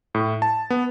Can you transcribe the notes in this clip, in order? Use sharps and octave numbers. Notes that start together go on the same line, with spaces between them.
A2
A5
B3